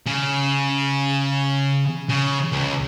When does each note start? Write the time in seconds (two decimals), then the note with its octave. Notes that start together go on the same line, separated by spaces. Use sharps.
0.06 C#3
2.09 C#3
2.52 C#2